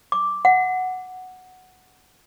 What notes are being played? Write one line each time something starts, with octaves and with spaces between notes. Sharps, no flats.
D6
F#5